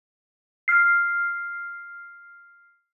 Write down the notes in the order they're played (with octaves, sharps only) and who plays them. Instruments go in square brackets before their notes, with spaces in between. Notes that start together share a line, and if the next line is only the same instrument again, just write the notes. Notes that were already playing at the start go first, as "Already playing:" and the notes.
[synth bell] F6 C7